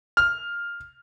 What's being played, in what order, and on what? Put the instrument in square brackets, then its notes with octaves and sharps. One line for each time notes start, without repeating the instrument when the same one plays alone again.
[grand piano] F6